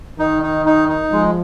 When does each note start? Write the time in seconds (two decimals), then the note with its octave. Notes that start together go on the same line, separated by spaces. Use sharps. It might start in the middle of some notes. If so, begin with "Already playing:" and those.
0.19 D#3 D#4
0.43 D#4
0.66 D#4
0.89 D#4
1.12 F3 G#3